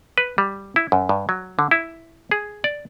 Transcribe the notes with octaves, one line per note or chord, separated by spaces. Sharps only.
B4
G3
E4
F#2
G2
F#3
D3
E4
G#4
D5